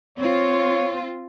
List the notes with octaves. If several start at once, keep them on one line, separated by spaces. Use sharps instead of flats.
C4 F4 C#5